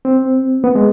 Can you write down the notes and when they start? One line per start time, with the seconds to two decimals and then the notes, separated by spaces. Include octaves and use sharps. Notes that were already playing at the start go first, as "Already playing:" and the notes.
0.05 C4
0.64 B3
0.75 G#3